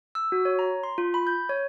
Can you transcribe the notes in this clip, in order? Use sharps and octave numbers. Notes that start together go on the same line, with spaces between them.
E6
F#4
C#5
A#5
C6
F4
B5
G6
C#5